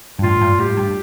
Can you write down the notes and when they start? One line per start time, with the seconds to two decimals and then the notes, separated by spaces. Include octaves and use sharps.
0.19 G2
0.23 A2 F4
0.41 G2
0.59 A2 G4
0.77 G2